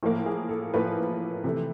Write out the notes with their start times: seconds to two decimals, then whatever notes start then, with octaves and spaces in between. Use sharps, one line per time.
0.03 A2 F3 A#3
0.26 G#4
0.49 A4
0.74 A2 F3 A#3 B4
1.44 C3 E3 A3